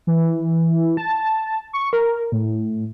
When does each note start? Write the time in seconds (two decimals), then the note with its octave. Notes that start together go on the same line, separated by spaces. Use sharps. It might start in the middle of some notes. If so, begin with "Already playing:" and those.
0.07 E3
0.97 A5
1.73 C#6
1.93 A#4
2.32 A2